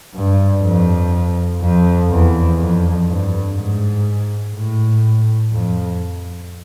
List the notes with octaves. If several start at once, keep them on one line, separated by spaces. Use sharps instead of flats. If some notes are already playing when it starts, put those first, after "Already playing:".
G2
F2
F2
E2
F2
G2
G#2
A2
F2